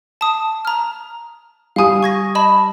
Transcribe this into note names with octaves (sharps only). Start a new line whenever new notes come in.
A5 D#6
A#5 F6
G3 F5 G#5 D#6
C#6 G#6 A#6
D#5 A5 B5